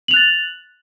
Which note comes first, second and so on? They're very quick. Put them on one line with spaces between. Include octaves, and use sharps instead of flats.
F#7 F7 F#6 A6